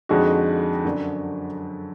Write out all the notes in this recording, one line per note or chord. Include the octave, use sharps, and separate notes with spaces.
F2 D3 G#3 D#4 F#4
F#2 D3 F#3 D4